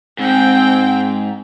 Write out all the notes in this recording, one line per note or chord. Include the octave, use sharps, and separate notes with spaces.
G#2 C4 G5